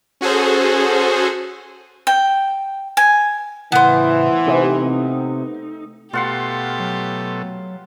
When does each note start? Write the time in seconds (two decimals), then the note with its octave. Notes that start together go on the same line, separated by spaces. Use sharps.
0.21 C#4 F#4 G#4 A4 C5
2.07 G5
2.97 G#5
3.72 A2 C#3 E3 B3 E4 C5
4.47 C3 A3 D#4
6.13 B2 A3 F4 G4 F#5 C6
6.80 F#3